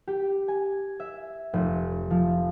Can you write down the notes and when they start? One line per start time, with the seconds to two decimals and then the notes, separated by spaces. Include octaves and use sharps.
0.07 G4
0.48 G#5
1.00 E5
1.53 F1
2.11 F3